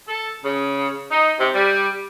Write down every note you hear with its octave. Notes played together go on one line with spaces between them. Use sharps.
A4
C#3
D#4
C3
G3